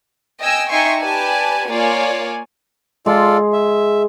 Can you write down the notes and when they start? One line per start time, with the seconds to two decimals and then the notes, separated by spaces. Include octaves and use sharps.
0.41 D#5 G5 G#5 E6
0.70 D#4 E5 G5 G#5 C6 C#6
1.00 G4 B4 D5 G#5 A5
1.69 A#3 F4 C#5 D5 G#5
3.06 G#3 F4 A4 D5
3.53 E5